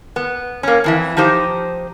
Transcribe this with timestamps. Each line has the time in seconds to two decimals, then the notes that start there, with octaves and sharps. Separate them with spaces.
0.16 B3
0.63 A#3 C#4
0.84 F2 E3 E5
1.17 F3 D#4 G4 C5